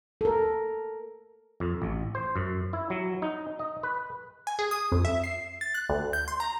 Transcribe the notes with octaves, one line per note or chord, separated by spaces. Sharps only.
A4 A#4
F2
A1
C5
F#2
E4
F#3
D#4
D#5
B4
G#5
G#4
D#6
F2
E5
C7
A6
F#6
D2
G6
C6
A#5